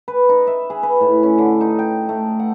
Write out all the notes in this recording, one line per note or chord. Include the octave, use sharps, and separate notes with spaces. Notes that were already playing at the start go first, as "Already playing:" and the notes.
B4
D#4
E5
G#4
B4
A2
C#4
D3
D#4
G5
A3
F#5